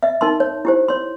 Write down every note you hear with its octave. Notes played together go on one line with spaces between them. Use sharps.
D#5 E5
D#4 A#4 A5 C6
C#5
E4 G4 C5
C#5 C6